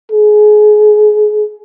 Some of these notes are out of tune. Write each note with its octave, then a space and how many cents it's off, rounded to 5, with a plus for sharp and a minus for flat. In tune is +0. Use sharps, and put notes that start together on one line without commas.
G#4 +25